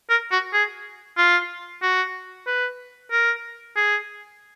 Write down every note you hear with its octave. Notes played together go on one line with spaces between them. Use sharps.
A#4
F#4
G#4
F4
F#4
B4
A#4
G#4